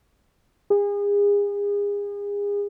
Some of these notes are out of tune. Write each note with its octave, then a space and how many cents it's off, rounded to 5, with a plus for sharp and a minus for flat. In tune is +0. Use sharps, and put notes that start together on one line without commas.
G#4 -35